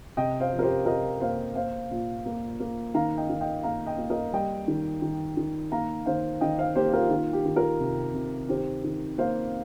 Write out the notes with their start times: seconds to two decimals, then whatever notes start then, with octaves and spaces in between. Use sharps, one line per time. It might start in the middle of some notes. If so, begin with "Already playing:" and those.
0.17 C3 D#5 G5
0.40 C5 F5
0.52 F3
0.59 A#4
0.63 G4 C5
0.86 C3 A#4 D#5
1.20 A#3 C5 F5
1.55 A#3 C5 F5
1.91 A#2
2.26 A#3
2.60 A#3
2.94 D#3 F5 A#5
3.18 D#5 G5
3.30 D#3
3.41 D#5 G5
3.63 A#3 F5 A#5
3.86 D#5 G5
3.98 A#3
4.10 A#4 D#5
4.33 G3 D#5 G5
4.68 D#3
5.02 D#3
5.37 D#3
5.72 A#3 F5 A#5
6.06 D#3 C5 F5
6.41 D#3 D#5 G5
6.58 C5 F5
6.75 A#3 G4 C5
6.93 F4 A#4
7.10 D#3 F4
7.33 G4
7.45 D#3
7.56 F4 A#4
7.80 C3
8.14 C3
8.49 D#3 G4 C5
8.84 D#3
9.18 A#3 C5 F5